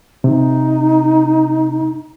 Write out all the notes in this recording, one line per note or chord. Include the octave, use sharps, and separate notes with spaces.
C3 D#4